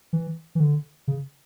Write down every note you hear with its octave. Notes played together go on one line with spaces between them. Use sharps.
E3
E3
D3
C#3